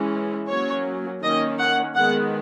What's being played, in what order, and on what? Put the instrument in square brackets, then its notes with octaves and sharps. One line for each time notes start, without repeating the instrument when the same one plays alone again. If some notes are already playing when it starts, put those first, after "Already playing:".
Already playing: [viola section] E3 G#3 C#4
F#3 A#3 C#4 C#5
D#3 A#3 C#4 D#5
F#5
D#3 G#3 B3 F#5